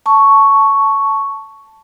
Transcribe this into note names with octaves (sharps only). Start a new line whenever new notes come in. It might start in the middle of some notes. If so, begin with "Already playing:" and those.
A5 C#6